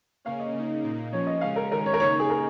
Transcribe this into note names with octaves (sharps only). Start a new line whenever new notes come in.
C#3 A#3 C#4 F5
D#5
C#3 A#3 D#4
A#2 A#3 D#4
F3 A#3 C#4 C#5
D#5
C#3 G#3 C#4 F5
A#4
D#3 G#3 C#4 A#4
C#5
A#4
C#3 A#3 D#4 C#5
G#4
A#4